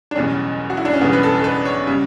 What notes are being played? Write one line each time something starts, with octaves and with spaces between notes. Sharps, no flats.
D4
F#1 E2 B2 G3 C#4
F#4
E4
D4
C#4
F#1 E2 B2 G3 B3
B4
A4
A4
B4
C#5
C#3 G3